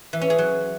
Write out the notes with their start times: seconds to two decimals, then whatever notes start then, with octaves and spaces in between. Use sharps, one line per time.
0.13 E3
0.21 C#4
0.30 G#4
0.38 F#3